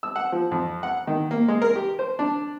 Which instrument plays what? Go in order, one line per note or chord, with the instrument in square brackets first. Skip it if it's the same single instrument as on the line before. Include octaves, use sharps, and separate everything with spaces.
[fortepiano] E6
F#5
F3
F2
F#5
D#3
A#3
G#3
A#4
G4
C5
D4